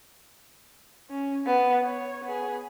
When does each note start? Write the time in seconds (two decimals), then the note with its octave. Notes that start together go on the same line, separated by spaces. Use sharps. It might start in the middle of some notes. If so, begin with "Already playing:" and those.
1.10 C#4
1.46 B3
1.84 C#5
2.24 B3 G#4